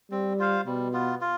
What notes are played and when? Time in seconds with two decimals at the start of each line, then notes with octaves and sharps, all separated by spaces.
0.11 G3 C4
0.39 F4 C5 F5
0.66 B2 G3
0.93 B3 F4
1.21 F4